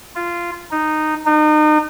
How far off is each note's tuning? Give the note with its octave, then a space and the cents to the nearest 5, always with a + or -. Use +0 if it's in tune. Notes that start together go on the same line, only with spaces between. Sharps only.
F4 -15
D#4 -10
D#4 -35